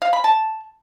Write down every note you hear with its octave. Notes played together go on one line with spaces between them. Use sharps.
F5
B5
A5